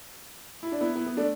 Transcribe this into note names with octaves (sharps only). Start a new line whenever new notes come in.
E4
D4
B3 E4
B3 E4
B3
A3 D4